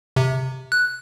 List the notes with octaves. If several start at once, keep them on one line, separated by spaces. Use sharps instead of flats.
C3
F#6